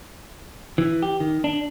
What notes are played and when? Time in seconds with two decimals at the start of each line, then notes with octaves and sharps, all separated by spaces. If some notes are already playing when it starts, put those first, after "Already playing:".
0.78 E3
1.02 G4
1.20 D#3
1.44 D4